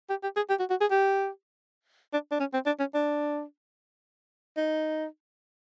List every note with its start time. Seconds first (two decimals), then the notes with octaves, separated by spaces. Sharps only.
0.10 G4
0.23 G4
0.36 G#4
0.50 G4
0.59 F#4
0.70 F#4
0.81 G#4
0.91 G4
2.13 D4
2.31 D4
2.40 C#4
2.54 C4
2.66 D4
2.79 C#4
2.94 D4
4.57 D#4